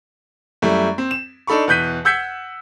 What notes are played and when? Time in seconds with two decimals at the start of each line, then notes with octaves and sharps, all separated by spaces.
0.62 F#2 G3 A3 E4
0.98 C4
1.11 E7
1.47 D4 D#4 A4 B5 C#6
1.67 E2 B2 F#6 G6 B6 D#7
2.05 F#5 E6 G6 G#6 B6 C#7